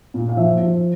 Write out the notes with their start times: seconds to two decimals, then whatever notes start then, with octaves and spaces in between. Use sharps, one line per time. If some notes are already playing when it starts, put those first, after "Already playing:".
0.14 A#2
0.29 F5
0.37 F3 E5
0.60 F3